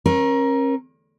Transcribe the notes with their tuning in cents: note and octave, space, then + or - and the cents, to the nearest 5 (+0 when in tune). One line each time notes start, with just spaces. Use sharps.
C#4 -40 A#4 +20